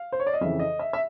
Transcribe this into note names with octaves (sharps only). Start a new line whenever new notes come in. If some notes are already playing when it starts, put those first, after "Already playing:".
Already playing: F5
C5
C#5
D5
D#5
F2 C#3 E3 E5
D#5
E5
E5